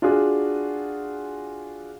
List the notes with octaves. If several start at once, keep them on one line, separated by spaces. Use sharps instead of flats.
D4 F4 F#4 G#4